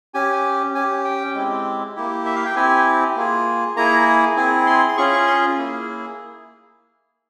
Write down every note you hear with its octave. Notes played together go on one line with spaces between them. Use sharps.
C#4 G4 G#5
C#4 G4 G#5
G5
G#3 C4 E4 G4
A#3 E4 G4
E5
F5
G5
C4 E4 G4 G#5
A#3 F4 G#4
A#3 E4 G#4 A#5
C4 E4 G#4 G#5
C6
C6
C#4 F4 G#4 C#6
C#6
C6
A#3 E4 G#4